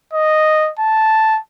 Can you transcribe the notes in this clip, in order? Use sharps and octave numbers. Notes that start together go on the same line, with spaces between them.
D#5
A5